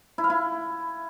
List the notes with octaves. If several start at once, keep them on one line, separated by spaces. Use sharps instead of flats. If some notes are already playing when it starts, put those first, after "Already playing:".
E4
F5
E4